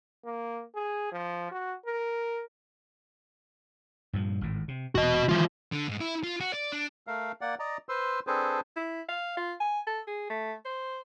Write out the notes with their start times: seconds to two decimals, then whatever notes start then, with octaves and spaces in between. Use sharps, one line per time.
0.25 A#3
0.75 G#4
1.12 F3
1.51 F#4
1.86 A#4
4.13 G2 A#2 F3
4.41 G#1 A2
4.68 C3
4.95 E1 F#4 D#5
5.29 D#3 E3 G#3 F4
5.72 D3
5.88 G#2
6.01 E4
6.24 F4
6.40 F#4
6.53 D5
6.72 D4
7.07 A3 A#4 F5
7.41 A#3 D5 F#5
7.59 D5 D#5 A#5
7.89 B4 C5 C6 E6
8.27 C4 D4 G#4 A4 B4 C5
8.76 E4
9.09 F5
9.37 F4
9.60 G#5
9.87 A4
10.07 G#4
10.30 A3
10.65 C5